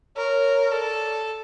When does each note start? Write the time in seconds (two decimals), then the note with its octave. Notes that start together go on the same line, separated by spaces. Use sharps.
0.17 A#4 C#5
0.72 A4 D5